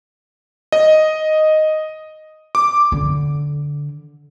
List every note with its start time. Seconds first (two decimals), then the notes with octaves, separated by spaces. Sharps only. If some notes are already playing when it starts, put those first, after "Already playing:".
0.72 D#5
2.55 D6
2.92 D3